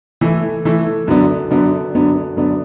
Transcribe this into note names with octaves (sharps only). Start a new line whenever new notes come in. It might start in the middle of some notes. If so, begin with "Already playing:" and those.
E3 A3 E4
E3 A3 E4
F#2 D3 B3 D4
F#2 D3 B3 D4
F#2 D3 B3 D4
F#2 D3 B3 D4